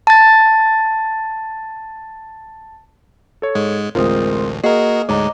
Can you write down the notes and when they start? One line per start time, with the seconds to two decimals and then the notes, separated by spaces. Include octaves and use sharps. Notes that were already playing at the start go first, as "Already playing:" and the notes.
0.07 A5 A6
3.42 A4 C#5
3.55 G#2 G#3
3.95 A1 D2 G#3 C4 F4 A#4 C5 D#6
4.63 A#3 F#4 G#4 A#4 D#5 F5 C7
5.09 D2 G#2 G#3 C#5 D#5 A#5 D6